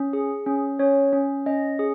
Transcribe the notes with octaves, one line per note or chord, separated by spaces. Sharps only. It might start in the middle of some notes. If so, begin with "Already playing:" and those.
Already playing: C#4
G#4
C#4
C#4 C#5
C#4
C#4 D#5
G#4